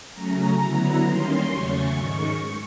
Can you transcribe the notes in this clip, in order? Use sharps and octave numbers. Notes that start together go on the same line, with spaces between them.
C#3 F#3 A3 C#4 A#5
D3 F#3 B3 E4
D#3 G3 A#3 C#4 C6
E2 C#3 F#3 A3 C#4 C#6
G#2 D#3 G#3